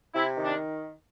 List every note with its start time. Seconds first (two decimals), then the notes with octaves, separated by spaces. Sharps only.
0.14 C3 E4
0.37 D#3
0.44 D4